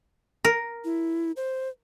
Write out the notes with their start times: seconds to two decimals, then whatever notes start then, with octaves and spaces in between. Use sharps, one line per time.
0.45 A#4
0.85 E4
1.36 C5